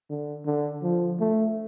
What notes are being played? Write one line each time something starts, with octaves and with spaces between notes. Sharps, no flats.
D3
D3
F3
A3